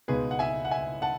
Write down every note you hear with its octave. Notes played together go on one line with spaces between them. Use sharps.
C#2 B2 G#3 B3 D#4 G#4 B4
F#5
E5 G#5
F#5
E5 G#5
F#5 A5